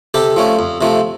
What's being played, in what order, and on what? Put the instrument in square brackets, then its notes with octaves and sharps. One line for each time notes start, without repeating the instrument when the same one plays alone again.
[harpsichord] C3 G4 A4
F3 A3 C#4
F2
C3 F3 A3